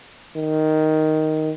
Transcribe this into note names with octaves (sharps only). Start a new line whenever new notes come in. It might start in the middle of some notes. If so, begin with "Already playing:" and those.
D#3